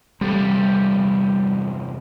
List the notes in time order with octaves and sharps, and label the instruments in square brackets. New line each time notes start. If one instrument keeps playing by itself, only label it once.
[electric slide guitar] E2 C3 A4 [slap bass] G3